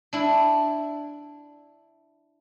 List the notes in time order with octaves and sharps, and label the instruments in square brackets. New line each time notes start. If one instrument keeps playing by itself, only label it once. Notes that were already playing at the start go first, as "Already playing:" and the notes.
[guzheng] D4 E4